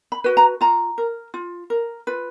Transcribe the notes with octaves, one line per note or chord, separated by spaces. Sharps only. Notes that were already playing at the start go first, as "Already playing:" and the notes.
B5
F#4 B4
A#5
F4 A#5
A#4
F4
A#4
F4 B4